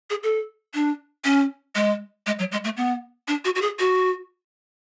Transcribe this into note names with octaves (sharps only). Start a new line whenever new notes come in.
G#4
A4
D4
C#4
G#3
G#3
F#3
G#3
A3
B3
D4
F#4
F#4
G#4
F#4